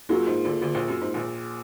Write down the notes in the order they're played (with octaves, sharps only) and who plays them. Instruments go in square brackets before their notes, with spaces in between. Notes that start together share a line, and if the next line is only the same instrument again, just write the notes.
[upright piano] F#2 F#3 [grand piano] A#3 F4 G#4
[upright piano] G#2
D2 D3
D2 D3
A#1 A#2
F#2
G#2
A#1 A#2